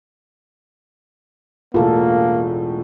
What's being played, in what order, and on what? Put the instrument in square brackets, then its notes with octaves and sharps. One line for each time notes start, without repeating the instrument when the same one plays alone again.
[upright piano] E1 A2 [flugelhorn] A#3 [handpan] F4 A4